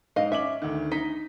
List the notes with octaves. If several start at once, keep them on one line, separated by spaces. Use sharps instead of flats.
G#2 D#5 F5
C#4 E5 D6 F#7
D2 D3 D#3
D#4 B6